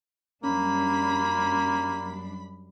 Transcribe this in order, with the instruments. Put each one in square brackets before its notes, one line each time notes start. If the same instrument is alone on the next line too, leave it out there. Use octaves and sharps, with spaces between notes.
[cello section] F#2 G3 D4 [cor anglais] A#3 [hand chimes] C#4 [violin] B5